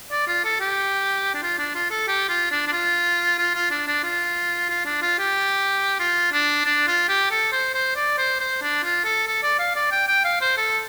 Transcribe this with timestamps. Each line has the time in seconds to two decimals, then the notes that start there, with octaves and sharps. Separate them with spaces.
0.11 D5
0.27 F4
0.44 A4
0.60 G4
1.34 D4
1.42 F4
1.59 D4
1.75 F4
1.91 A4
2.08 G4
2.29 F4
2.51 D4
2.68 D4
2.72 F4
3.38 F4
3.55 F4
3.71 D4
3.87 D4
4.04 F4
4.69 F4
4.85 D4
5.02 F4
5.19 G4
6.00 F4
6.32 D4
6.65 D4
6.87 F4
7.09 G4
7.31 A4
7.52 C5
7.74 C5
7.96 D5
8.18 C5
8.40 C5
8.62 D4
8.83 F4
9.05 A4
9.27 A4
9.43 D5
9.59 F5
9.76 D5
9.92 G5
10.08 G5
10.25 F5
10.41 C5
10.57 A4